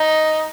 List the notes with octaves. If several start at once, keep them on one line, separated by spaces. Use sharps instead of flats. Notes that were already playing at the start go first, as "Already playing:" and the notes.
Already playing: D#4